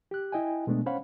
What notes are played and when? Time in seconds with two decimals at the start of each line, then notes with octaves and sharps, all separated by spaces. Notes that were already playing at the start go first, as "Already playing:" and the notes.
0.11 G4 F#6
0.32 E4 D#5 G5 G#5
0.67 B2 G#3 A3 B3 D4
0.86 C#4 C5 C#5 F5 F#5 B5